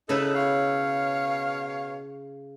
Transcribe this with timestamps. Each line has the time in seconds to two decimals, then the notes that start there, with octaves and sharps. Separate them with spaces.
0.09 C#3 D#4 E4 A4 B4
0.35 B2 C#5 F5